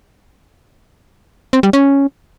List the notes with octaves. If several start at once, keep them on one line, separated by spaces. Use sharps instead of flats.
C4
G3
C#4